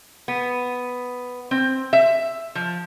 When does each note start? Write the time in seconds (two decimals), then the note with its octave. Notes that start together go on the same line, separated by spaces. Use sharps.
0.28 B3
1.51 C4
1.93 E5
2.55 F3